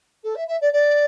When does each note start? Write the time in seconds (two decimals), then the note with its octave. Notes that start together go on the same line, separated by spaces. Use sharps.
0.23 A4
0.35 E5
0.47 E5
0.61 D5
0.72 D5